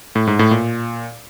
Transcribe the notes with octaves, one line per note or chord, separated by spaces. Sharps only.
A2
G#2
A2
A#2